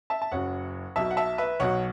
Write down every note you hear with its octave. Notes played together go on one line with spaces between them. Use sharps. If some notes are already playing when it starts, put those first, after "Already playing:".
E5 A5
A5
F#1 F#2 F#3 C#5 F#5
B1 B2 F#3 E5 A5
F#5
E5 A5
B4 E5
B1 B2 F#3 C#5 F#5